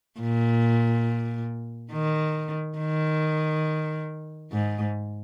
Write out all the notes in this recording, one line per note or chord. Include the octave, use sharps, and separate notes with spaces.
A#2
D#3
D#3
G#2